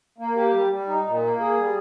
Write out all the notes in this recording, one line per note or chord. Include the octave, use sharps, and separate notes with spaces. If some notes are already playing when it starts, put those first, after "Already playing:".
A#3
G4
G3
G3
D#4
A#2
A#3
G#4
G3